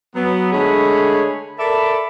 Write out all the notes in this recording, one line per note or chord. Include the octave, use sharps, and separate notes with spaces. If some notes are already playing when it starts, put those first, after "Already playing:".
F#3 B3
D3 G#3 A3 G#4 C#5 B5
A4 A#4 D5 E5 A5 B5